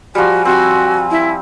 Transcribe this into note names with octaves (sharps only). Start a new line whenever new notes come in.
F3 G3 F#4 G#5
C4 F#4
E4